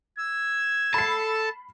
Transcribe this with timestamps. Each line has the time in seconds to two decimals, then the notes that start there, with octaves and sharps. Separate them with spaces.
0.18 E6 G#6
0.94 A4 A5 B5 C7